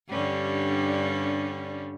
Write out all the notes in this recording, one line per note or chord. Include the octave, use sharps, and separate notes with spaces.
G2 D3 G3 C#4